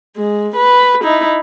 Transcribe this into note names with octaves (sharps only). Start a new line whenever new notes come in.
G#3
B4
D#4 E4